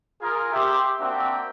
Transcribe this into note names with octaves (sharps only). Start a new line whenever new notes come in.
F4 G#4 A#4
G4 E5 C6
A#3 C4 D4 F#4 E5 G5